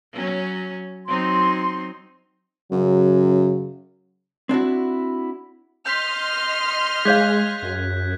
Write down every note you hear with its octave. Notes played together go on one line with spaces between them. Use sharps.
F#3 C#4
F#3 C4 D#4 C6
F#2 C#3 F#3
C4 D4 E4 F#4
D#5 C6 F6 G6 B6
G#3 G#4 C#5 F5 F#6 G#6 B6
F#2